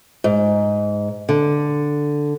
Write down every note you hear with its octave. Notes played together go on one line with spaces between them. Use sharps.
G#2
D3